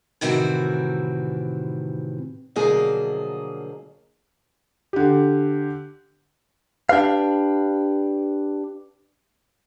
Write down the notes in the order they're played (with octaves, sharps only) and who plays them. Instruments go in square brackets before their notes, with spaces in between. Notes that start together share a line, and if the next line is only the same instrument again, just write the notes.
[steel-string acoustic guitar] A2 C3 D#3 E3 C4 F#4
B2 D3 F3 F#3 A#3 G#4
[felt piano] D3 G4
[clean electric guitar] D4 G4 B4 F5